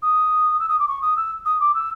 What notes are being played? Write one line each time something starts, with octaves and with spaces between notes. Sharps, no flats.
D#6
E6
D#6
D6
C#6
D#6
E6
D#6
D6
E6